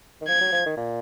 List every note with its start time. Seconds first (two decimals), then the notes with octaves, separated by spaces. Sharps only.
0.21 D#3
0.28 F3 G#6
0.41 F#3
0.53 F3
0.66 D#3
0.77 A#2